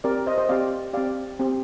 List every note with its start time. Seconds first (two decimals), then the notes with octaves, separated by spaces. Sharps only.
0.04 C4 G4 A#4 D5
0.26 C5 D#5
0.38 C5 D#5
0.49 C4 G4 D5 F5
0.93 C4 G4 D5 F5
1.40 C4 G4